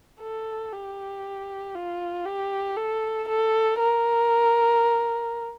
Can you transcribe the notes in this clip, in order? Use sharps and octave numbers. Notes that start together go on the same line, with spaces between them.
A4
G4
F4
G4
A4
A4
A#4